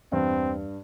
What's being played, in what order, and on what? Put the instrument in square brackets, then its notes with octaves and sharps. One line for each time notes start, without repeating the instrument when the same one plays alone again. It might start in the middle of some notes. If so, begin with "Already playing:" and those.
[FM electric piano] E2 [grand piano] G2 [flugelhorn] C4